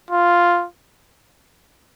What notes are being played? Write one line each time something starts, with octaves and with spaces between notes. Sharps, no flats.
F4